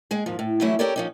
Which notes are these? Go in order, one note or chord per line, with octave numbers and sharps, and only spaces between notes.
G#3 G#4
D#2 G#2 F3
A2
E3 F#3 G3 A3 C#4 E4
C#4 G4 A4 A#4 C#5 D5
F3 C#4 D#4